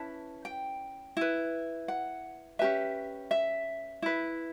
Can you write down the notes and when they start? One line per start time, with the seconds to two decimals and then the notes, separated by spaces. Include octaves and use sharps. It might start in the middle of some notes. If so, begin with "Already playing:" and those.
Already playing: C#4 E4 B4 A5
0.45 G5
1.17 E4 B4
1.88 F#5
2.59 C#4 G4 B4 E5
3.31 E5
4.02 E4 B4